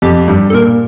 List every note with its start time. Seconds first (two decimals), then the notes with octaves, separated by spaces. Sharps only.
0.02 F2 G4
0.28 G2
0.50 A4
0.53 A#2 A#4